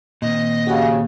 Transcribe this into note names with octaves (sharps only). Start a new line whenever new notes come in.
A#2 D#3 C4 D#5
C#3 F#4 G4 F#5